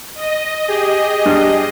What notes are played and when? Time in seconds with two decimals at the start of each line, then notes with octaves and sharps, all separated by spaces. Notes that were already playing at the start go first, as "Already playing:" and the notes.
0.14 D#5
0.68 G4 G#4
1.26 G2